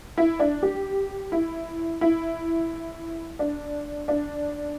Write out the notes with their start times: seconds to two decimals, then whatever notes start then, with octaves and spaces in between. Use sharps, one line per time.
0.18 E4
0.40 D4
0.63 G4
1.32 E4
2.01 E4
3.39 D4
4.08 D4